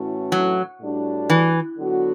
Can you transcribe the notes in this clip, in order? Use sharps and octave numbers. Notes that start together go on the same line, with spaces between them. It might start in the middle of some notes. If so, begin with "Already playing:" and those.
Already playing: A2 E3 A3 C#4 F#4
F#3
A2 G3 D4 F#4
E3
D3 F#3 B3 F#4